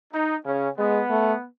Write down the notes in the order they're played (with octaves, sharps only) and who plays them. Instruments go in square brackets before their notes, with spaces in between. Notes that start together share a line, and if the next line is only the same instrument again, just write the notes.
[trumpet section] D#4
[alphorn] C#3 [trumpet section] C#4
[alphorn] G#3 [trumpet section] B3
[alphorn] A3